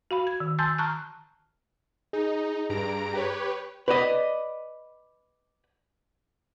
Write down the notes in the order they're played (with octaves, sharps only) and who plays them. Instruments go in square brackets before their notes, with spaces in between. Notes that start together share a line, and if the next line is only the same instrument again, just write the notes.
[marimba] F#4 F5 B5
G#6
D#3
G#5 A5 C6 E6 G6 A6
A5 A#5 C#6 F6 F#6
[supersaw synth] D#4 [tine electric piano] G#4
[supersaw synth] G2 A#5 D7
G4 B4 C#5
[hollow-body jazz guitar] B4 D5 D#5